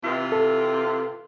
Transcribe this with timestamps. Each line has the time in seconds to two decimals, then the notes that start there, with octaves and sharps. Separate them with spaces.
0.04 C3 E3 F4
0.32 A4